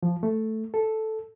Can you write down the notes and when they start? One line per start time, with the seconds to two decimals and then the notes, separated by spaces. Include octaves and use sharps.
0.03 F3
0.23 A3
0.74 A4